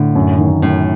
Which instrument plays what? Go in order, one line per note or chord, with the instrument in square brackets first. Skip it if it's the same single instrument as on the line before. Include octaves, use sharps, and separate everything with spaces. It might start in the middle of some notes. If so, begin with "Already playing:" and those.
Already playing: [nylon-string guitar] A2 [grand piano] D3
[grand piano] F#2
D#3
[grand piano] F#2 [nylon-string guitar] A2